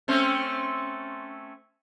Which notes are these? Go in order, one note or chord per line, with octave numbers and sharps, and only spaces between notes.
A3 C4 C#4